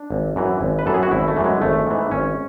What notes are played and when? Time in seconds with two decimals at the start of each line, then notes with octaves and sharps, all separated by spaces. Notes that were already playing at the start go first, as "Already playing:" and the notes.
Already playing: D4
0.10 G#1
0.36 F#2 E3
0.61 G#1
0.79 B4
0.86 F#2 E3 A4
0.94 G#4
1.03 F#4
1.11 G#1 E4
1.28 A3
1.36 F#2 E3
1.45 G#3
1.61 G#1 A3
1.87 G#2 E3
2.11 G#1 C#4